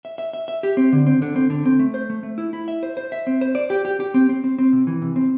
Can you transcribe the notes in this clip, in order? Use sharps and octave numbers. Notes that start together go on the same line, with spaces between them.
E5
E5
E5
E5
G4
C4
D3
C4
D3
C4
D3
C4
A3
C5
A3
A3
E4
E4
E5
C5
C5
E5
C4
C5
D5
G4
G4
G4
C4
C4
C4
C4
C3
E3
C3
C4